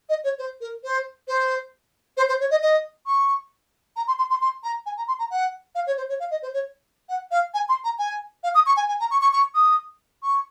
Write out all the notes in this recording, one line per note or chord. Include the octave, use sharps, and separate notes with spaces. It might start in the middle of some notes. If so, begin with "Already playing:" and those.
D#5
C#5
C5
A#4
C5
C5
C5
C5
C#5
D#5
D#5
C#6
A#5
C6
C6
C6
C6
A#5
G#5
A#5
C6
A#5
F#5
F5
C#5
C5
C#5
F5
D#5
C5
C#5
F#5
F5
G#5
C6
A#5
G#5
F5
D#6
C#6
G#5
G#5
A#5
C#6
C#6
C#6
D#6
C#6